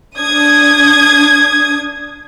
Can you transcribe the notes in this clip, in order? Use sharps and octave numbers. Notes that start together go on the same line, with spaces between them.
D4 D#6 G#6